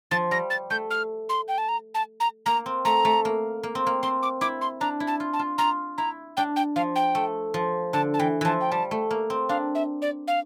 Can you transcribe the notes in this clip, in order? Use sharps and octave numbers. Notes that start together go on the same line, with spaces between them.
F3 A6
G3 A#6
A6
A3 G6
F6
C6
G5
A5
A#5
A5
A#5
A#3 A#5
C4
A3 A#5
A3
A#3
A#3
C4
A#3
C4 C6
D6
E4 D6
C6
D4 A#5
E4
A5
F4
A5
F4
F4 A#5
E4 A#5
D4 G5
G5
F3 F5
G5
A3
F3
D3 A5
A5
E3 G5
E3 F3 A5
G5
G3 A5
A3
A#3
C4
D4 F5
E5
D5
F5